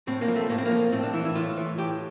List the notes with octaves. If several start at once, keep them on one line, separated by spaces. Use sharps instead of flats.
A2 C4
A#3
F3
A3
A2 A#3
C4
A#3
F3
A2 C4
D4
E3 E4
E4
A2 F4
E3
A2 G4